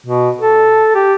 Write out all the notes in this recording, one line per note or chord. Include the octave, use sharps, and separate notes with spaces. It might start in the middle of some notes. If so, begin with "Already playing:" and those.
B2
A4
G4